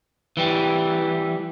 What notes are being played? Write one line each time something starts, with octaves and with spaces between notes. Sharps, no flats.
E3 G3